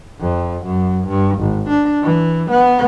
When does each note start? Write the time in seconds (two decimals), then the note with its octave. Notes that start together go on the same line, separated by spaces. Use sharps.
0.20 F2
0.65 F#2
1.08 G2
1.39 G#1
1.69 D4
2.03 E3
2.50 B3